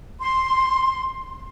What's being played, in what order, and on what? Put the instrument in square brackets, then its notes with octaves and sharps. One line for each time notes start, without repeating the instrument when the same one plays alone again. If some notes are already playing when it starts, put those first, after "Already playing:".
[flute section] C6